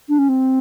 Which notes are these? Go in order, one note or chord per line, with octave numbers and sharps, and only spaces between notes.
D4
C#4
C4